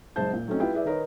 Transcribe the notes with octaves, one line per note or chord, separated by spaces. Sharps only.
F#1 G#3 C5 A5 G6
A#2
F#3 A3 C4 C#4 D#4
E4 F4 G4 B4 G5
E4 G#4 B4 D5 E5
D#3 D#4 A#4 B4 C#5